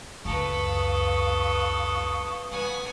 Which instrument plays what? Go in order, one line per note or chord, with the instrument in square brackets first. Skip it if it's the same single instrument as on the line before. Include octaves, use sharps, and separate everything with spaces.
[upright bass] C#2 F#2 [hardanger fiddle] A4 B4 [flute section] F5 C#6 D#6
[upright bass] G3 [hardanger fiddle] B3 G#5